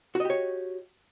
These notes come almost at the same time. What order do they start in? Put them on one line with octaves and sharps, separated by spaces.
F#4 D#5 G4 C#5